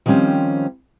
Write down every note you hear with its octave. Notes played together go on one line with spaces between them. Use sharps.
D#3 F3 G3 C4 C#4